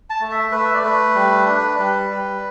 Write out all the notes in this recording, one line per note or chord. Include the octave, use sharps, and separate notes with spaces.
A5
A3
E5
A3 B4
E5
D5
A3 B4
G3
D4
G3
G3